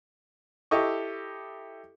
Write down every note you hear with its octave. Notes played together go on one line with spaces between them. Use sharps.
E4 G4 A4 D#5 C#6